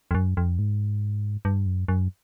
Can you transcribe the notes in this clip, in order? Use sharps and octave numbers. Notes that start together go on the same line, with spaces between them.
F2
F#2
F2
G#2
G2
F#2
F#2